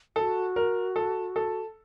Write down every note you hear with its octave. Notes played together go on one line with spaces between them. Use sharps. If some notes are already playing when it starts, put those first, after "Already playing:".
F#4 A4
A#4
A4
A4